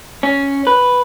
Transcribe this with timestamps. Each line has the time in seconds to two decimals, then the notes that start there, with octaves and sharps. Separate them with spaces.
0.23 C#4
0.67 B4